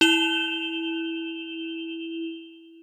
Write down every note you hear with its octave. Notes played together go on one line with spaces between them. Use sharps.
E4 E7 F7 G7